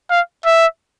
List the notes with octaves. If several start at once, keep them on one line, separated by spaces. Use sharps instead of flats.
F5
E5